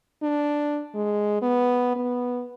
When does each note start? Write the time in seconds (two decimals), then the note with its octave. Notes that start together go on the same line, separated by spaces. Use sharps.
0.22 D4
0.95 G#3
1.42 B3
1.96 B3